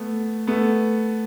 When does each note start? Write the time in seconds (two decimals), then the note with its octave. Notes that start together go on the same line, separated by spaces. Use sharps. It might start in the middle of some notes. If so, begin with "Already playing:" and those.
Already playing: A3 B3
0.47 A3 B3